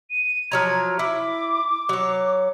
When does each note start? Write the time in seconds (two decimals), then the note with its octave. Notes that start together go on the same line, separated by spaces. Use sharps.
0.11 D#7
0.52 F3 F#3 A#5 G#6
0.99 E4 D6
1.89 F#3 C#5